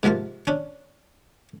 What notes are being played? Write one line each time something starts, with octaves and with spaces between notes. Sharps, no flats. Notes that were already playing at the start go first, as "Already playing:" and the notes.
G#2 C3 F3 A#3 F4
C#4 D4